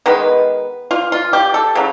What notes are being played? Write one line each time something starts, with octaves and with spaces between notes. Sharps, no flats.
D#3 G#3 B3 B4
F4
F4
G4
A4
C#3 F#3